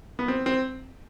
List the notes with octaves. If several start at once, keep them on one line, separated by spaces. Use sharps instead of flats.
B3
C4
C4